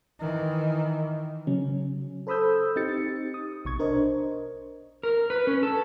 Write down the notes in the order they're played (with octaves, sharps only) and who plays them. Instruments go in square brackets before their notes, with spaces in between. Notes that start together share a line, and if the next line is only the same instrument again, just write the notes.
[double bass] D#3 E3
[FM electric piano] C#3 F#3 C#4
A4 C5 B5 D#6 E6 G6
C4 D#4 G4 A6 C#7
D#6
A#1 B2 C#6 G#6
D4 A#4 C5 D#5
[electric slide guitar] A#4
B4
C#4
A4